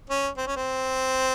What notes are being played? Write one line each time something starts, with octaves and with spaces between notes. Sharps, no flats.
C#4
C4
C#4
C4